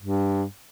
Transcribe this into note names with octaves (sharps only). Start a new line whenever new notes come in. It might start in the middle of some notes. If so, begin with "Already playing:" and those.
G2